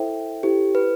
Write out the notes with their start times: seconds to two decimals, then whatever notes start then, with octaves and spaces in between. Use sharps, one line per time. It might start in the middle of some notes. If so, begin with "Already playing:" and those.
Already playing: E4 A4 C5 E5 G5
0.43 E4 G4 A4 C5
0.75 B4